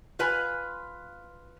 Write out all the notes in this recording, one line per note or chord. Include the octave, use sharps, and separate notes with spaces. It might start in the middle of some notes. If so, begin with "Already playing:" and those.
F4 B4 G#5